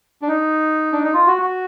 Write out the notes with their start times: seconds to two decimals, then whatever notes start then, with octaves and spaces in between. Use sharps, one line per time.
0.22 D4
0.28 D#4
0.93 D4
1.04 D#4
1.14 F4
1.27 F#4
1.42 F#4